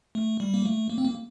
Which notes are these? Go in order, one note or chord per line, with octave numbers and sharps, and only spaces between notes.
A3
G3
A#3
A3
A#3
C4
A#3